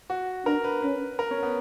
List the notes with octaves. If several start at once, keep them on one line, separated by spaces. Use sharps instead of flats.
F#4
D4 A#4
B4
C#4 B4
A#4
C#4
B3